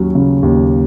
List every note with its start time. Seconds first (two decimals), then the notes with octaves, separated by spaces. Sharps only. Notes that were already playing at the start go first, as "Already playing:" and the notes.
Already playing: D#2 F#3 C#4
0.15 C#3
0.43 D#2